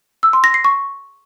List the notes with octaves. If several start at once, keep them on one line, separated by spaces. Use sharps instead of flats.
E6
C6
A#6
C7
C#6